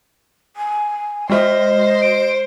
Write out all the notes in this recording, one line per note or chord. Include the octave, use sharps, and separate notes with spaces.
G#5
G#3 F#4 C5 D#5
D7